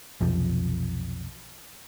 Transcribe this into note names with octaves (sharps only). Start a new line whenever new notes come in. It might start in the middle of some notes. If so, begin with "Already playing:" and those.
B1 F2 C3 F3